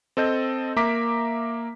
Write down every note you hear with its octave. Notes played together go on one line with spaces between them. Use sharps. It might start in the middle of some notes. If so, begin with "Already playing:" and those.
C4 A4 D#5 G6
A#3 E5 A#5 D6 B6